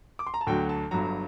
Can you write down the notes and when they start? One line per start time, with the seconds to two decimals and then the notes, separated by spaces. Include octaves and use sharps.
0.19 D6
0.27 C6
0.34 A#5
0.41 A5
0.47 D2 D3 F#3 G5
0.69 A5
0.91 G1 G2 F#3 A#5